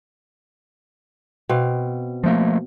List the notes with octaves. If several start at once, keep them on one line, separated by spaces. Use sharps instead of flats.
B2 C4 F5
F3 A3 A#3